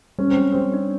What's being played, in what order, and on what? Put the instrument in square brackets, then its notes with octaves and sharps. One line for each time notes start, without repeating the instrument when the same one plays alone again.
[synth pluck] G3 [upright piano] C#4
[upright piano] C4
[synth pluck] G3
[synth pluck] G3 [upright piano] C4
[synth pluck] D4